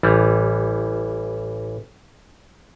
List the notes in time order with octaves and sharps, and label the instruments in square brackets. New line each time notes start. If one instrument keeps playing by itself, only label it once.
[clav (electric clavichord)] A1 E3 G3